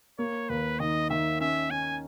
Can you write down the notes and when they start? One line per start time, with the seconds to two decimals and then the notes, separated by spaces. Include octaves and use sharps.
0.19 A#3 C#5
0.49 D#2 B4
0.80 D#3 D#5
1.10 D#3 E5
1.40 C#4 E5
1.70 C#4 G#5